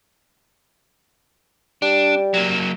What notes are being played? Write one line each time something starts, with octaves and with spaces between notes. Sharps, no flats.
G3 D4
F#3 A#3